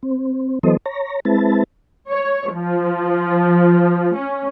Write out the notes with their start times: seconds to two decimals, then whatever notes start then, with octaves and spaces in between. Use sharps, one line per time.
0.03 C4
0.63 E3 F#3 B3 A4 C5 D#5
0.86 C#5 A#5
1.25 G#3 C4 E4 B4 A5
2.09 C#5
2.54 F3
4.15 C#4